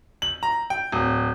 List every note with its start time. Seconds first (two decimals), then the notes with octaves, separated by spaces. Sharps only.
0.22 F#7
0.43 A#5
0.70 G5
0.92 D1